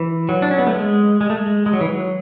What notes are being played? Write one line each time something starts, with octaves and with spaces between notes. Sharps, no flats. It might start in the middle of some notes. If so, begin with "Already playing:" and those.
Already playing: E3
F#3
D4
C#4
B3
A3
G#3
G#3
A3
G#3
G#3
F#3
E3
F#3